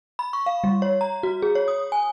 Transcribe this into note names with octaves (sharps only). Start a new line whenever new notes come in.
B5
C#6
F5
G3
C#5
A#5
F#4
G#4
C#5
D#6
G#5